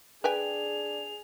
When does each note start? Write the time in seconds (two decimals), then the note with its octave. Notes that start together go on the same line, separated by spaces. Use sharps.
0.24 D4 G#4 B4 G5 G#5 F7